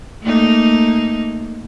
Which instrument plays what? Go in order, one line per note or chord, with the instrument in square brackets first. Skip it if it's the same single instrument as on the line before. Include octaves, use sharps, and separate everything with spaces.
[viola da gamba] A3 A#3 D#4